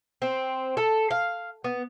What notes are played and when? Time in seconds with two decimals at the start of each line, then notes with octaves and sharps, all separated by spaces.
0.22 C4
0.77 A4
1.10 F5
1.64 B3